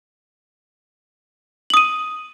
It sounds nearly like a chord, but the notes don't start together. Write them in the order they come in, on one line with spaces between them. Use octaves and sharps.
F#7 D#6 D#7